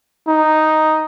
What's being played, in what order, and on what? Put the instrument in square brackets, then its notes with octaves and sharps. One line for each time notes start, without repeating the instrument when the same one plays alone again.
[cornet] D#4